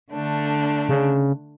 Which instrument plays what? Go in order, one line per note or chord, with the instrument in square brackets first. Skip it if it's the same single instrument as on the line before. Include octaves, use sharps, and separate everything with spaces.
[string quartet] D3 A3 D4
[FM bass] C#3